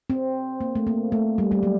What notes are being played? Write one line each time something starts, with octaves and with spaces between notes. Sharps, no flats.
C4
A#3
A3
A#3
A3
G3
G3
F#3